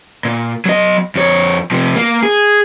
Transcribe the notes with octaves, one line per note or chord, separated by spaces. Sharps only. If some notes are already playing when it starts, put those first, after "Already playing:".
A#2
F#3 D#5
F2 C#5
C3 F3
A#3
G#4